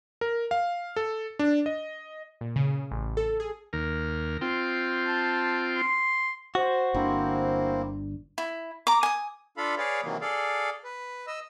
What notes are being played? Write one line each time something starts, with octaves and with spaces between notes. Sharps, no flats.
A#4
F5
A4
D4
D#5
A#2
C#3
A1
A4
G#4
D#2 A#4
C4 F4 G5
A5
C6
F#4 C5
G1 D3 A#3 C4 D4 E4
E4
A#5 D6
G#5 D#6
D4 F4 A4 F5 B5
G#4 B4 C#5 D5 F5
C3 D#3 E3 F#3 A#3
G#4 A4 D5 F5
B4
D#5 E6